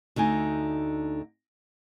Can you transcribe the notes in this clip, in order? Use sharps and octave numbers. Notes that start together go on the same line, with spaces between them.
D2 D3 D#4 G#5